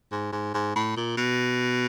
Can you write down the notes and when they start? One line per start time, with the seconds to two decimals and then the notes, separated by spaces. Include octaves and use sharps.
0.12 G#2
0.32 G#2
0.54 G#2
0.75 A2
0.97 A#2
1.17 B2